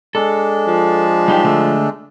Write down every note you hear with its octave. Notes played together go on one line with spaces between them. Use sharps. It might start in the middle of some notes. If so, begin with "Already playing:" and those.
G#3 D4 A4
F3
G3 D#4 G4
D3 A3